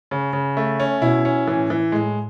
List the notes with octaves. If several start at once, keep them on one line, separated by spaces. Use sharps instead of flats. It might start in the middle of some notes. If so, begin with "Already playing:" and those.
C#3
C#3
A3
C#4
B2 E4
C#4
A2 E3
E3
A2 G#3